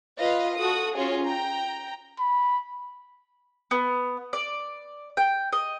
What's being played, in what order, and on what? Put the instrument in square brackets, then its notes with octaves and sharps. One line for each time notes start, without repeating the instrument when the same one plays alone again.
[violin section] F4 B4 D#5 F5
F#4 A4 D#6
C#4 F4 F#4 G#4
G5 A#5
[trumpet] B5
[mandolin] B3
D5
G5
D#5